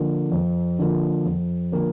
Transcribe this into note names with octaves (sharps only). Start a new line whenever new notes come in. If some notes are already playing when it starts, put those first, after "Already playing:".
Already playing: D3 F3 A#3
F2
D3 F3 A#3
F2
D3 F3 A#3